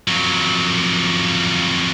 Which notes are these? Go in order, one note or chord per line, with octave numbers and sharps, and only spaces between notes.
F2 F#3